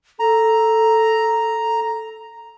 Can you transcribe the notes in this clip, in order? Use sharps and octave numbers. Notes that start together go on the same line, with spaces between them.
A4 A#5